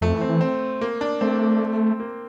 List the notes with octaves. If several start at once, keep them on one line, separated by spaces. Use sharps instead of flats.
F2 A3
E3
C4
E3
C4
A#3
D4
A3 C4
A#3